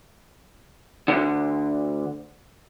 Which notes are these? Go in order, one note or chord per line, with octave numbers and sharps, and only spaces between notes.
D2 G2 D3